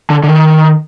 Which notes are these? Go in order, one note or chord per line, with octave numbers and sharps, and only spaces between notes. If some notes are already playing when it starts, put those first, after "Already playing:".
D3
D3
D#3